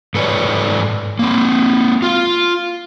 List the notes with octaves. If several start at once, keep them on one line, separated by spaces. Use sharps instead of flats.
G#2 A4 B4 C#5 D5
A#3 C4
F4 F5